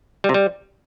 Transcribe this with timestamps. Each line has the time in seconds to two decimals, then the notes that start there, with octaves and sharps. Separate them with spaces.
0.24 G3
0.29 C3
0.34 G3